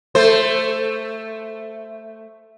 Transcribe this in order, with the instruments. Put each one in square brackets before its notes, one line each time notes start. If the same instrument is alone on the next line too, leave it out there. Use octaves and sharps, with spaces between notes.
[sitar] A3 C5